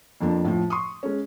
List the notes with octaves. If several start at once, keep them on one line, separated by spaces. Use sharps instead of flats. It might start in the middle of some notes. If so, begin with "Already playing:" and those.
F2 F3 A#3 D4
A2 F3
C6 C#6 D#6
G#3 C#4